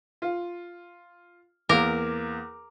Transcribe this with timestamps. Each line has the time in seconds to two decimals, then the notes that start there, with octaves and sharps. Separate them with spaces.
0.22 F4
1.69 E2 A#3 A#4 D6